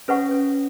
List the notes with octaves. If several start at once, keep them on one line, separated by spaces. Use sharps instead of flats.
C#4 B4 F#5 C#6
C#4